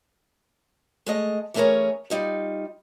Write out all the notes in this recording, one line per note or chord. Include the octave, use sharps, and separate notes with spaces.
G#3 A3 D#5
E3 A3 C#4 G#4 A#4 C#5
G3 D#4 F4